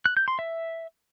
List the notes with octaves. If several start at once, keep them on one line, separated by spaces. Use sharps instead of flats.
F#6
G6
C6
E5